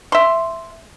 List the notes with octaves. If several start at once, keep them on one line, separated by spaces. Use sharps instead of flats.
E5 C6